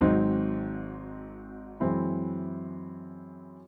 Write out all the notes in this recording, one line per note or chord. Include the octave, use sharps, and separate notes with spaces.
G#1 G#2 F#3 C4 D#4
F#2 E3 G#3 C4 E4